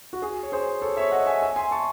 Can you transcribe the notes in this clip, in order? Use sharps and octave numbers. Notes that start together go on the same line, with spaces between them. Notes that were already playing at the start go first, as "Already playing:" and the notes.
F#4
G#4
C#5
G#4 C5
A4 C#5
C#5 E5
D#5 F#5
E5 G#5
E5 G#5
G#5 C6
A5 C#6